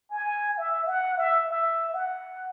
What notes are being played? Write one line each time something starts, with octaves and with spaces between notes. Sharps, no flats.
G#5
E5
F#5
E5
E5
F#5